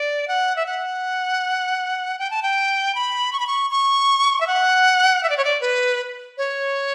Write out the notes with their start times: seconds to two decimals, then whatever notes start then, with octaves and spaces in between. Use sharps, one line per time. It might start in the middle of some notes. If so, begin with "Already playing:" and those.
Already playing: D5
0.28 F#5
0.56 E5
0.67 F#5
2.19 G5
2.30 A5
2.43 G5
2.95 B5
3.33 C#6
3.40 B5
3.47 C#6
3.71 C#6
4.41 E5
4.47 F#5
5.23 E5
5.30 D5
5.37 C#5
5.45 D5
5.61 B4
6.38 C#5